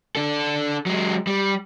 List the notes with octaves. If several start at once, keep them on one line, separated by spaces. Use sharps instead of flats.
D4 A4
F#3 G#3
G3